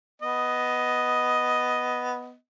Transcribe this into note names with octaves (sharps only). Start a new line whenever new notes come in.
B3 D#5